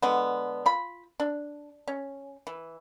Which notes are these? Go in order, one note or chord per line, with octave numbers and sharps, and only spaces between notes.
D3 G#3 B3
F4 B5
D4
C#4
E3